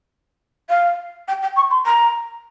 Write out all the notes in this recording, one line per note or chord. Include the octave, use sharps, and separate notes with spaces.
F5
G5
G5
C#6
C6
A#5